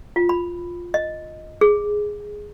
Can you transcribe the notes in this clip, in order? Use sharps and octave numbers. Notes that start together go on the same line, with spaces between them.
F4
B5
D#5
G#4